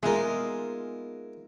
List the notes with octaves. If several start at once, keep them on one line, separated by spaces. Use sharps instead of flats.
G#3 A#3 B3 D#4 F4 G#4 A#4 E5